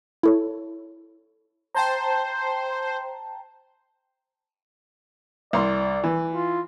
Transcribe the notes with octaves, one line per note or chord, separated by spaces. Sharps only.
E4 A4 C#5
C5 G5 A5 A#5
C2 D5 C6
E3
F4